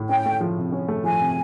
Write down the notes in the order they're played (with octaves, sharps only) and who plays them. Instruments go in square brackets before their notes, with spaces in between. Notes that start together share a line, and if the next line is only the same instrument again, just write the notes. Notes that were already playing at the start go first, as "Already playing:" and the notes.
Already playing: [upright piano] A2
[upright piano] C#4 [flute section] G5
[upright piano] A3
F3
C3
C#4
A3
[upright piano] F3 [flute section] G#5
[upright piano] C3